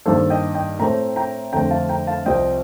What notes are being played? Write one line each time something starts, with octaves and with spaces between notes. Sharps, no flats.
G2 D#3 A#3 A4 C5
D#5 G5
D#5 G5
A2 A3 C4 G5 A#5
G5 A#5
F2 D3 A3 C4 G5 A#5
F5 A5
G5 A#5
F5 A5
C2 C3 F3 C4 D#5 G5